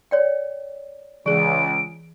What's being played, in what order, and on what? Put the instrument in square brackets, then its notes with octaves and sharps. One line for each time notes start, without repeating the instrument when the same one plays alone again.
[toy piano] C#5 D5 G5
[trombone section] C#2 [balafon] E3 G#4 [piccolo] D7